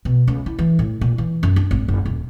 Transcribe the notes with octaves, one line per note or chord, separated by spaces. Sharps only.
B2
C#2
E4
E3
A2
A#2
E3
F#2
D4
G#1
F#1
D#1